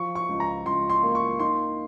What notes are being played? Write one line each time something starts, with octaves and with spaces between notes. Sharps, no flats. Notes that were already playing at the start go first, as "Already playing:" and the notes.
Already playing: F3 C#6
C#6
C#2
A#5
C#2 C6
C6
A#3
C#6
D#4 C6